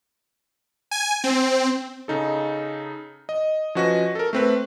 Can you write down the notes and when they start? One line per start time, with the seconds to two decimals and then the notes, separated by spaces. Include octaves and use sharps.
0.91 G#5
1.24 C4
2.08 C#3 D#4 A4
3.29 D#5
3.75 F3 C#4 F#4 B4 D#5 A#6
4.15 A4 A#4
4.33 A3 C4 B4